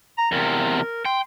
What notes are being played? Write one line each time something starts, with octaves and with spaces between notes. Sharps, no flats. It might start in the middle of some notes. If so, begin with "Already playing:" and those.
A#5
E2 C3 A#4
G5 C6